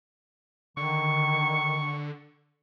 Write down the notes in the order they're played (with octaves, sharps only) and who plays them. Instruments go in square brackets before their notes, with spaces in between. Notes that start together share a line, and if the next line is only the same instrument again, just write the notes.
[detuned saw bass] D3 [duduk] D#3 [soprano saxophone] C#6